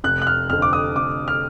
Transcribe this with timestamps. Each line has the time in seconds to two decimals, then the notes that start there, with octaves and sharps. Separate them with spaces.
0.04 F1 F#6
0.22 F#6
0.27 F6
0.50 F2 D3 F6
0.62 D6
0.73 D#6
0.96 F1 D6
1.28 F6